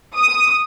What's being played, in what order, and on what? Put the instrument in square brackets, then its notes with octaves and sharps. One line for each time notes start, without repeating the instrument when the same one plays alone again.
[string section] D#6